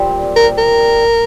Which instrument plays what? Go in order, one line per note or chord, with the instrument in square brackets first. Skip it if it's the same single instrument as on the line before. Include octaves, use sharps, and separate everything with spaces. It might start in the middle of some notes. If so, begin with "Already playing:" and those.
Already playing: [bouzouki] A#2 G3 C4
[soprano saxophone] A#4
A#4